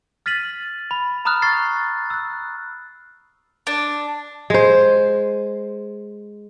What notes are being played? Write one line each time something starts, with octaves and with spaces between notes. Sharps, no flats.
F6 A6 B6 D#7 F#7
B5
A#5 B5 D#6 F6 F#6
C#6 F6 A6 C7
E6 F#6
D4
G#3 C5